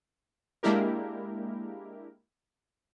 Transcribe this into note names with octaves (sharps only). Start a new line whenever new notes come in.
G#3 A#3 D4 E4 G4 A#4